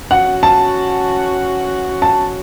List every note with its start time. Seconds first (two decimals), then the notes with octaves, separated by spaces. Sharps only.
0.11 E3 C#4 F#4 F#5
0.43 A5
2.02 A5